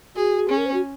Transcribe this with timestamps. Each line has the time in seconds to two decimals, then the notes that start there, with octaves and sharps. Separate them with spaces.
0.16 F#4 G#4
0.49 C#4 G#4
0.57 A#4
0.66 C5
0.74 F#4